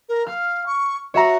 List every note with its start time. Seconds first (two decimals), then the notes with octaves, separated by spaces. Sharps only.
0.09 A#4
0.27 F5 F6
0.66 C#6
1.14 F#4 C#5 E5 A#5